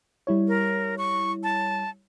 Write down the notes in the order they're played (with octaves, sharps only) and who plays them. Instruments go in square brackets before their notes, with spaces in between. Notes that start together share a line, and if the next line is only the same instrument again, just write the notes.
[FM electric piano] G3 E4 C#5
[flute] A#4
C#6
A5